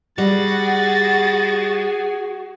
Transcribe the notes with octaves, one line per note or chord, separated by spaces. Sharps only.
G3 F#4 G#4 A6